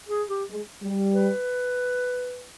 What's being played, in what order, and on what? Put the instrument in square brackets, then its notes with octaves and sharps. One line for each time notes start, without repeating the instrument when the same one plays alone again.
[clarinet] G#4
G4
[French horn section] G#3
G3
[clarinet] B4